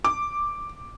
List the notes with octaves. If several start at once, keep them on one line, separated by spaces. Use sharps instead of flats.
D6